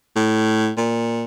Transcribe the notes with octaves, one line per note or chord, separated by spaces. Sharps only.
A2
A#2